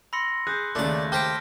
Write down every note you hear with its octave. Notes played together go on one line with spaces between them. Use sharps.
B5 C6 E6 A#6 C#7
G#4 F#6 G6
D#2 C#3 A3 D4 D5
G4 C5 A5 A#5 F6 G6 B6 D7